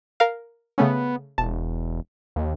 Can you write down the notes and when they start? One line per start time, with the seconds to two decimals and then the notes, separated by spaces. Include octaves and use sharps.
0.20 A#4 F5
0.78 C#3 A3 B3 C#4
1.38 E1 A5
2.36 D#2